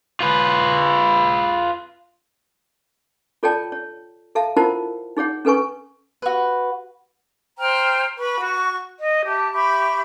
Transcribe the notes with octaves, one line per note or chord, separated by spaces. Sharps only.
F4 B4
F4 A4 C#5 D5 G5 A5
C#5
A4 E5 F5 A5
E4 F4 A#4 C5 F#5 A5
D#4 G#4 C#5 F#5
C#4 A4 B4 G#5 C#6
F#4 B4
C5 G5 A#5 F6
B4 B5 C#6
F#4 C#6
D#5
G4 E5 A5
G4 E5 B5 C#6